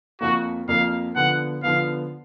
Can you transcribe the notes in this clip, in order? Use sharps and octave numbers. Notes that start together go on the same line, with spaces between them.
F2 F3 A#3 F#4
F2 F3 A#3 F5
D3 F3 B3 F#5
D3 F3 B3 F5